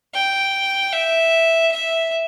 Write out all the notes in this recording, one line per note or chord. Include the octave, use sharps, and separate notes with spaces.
G5
E5
E5